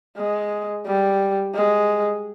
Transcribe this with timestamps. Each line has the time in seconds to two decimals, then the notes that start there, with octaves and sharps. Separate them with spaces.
0.17 G#3
0.86 G3
1.54 G#3